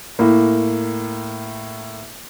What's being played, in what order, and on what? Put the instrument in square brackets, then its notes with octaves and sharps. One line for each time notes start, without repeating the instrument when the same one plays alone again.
[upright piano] A2 A#3